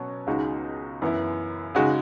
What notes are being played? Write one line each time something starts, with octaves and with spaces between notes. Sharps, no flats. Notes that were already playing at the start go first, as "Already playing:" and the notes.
Already playing: B2 F#3 C#4
C#2 C#3 G#3 D#4 F#4
F#2 E3 B3 E4
C#3 G#3 D#4 F#4